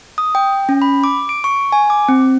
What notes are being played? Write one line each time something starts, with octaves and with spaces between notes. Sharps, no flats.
D#6
G5
C#4
B5
D6
D7
C#6
G#5
D6
C4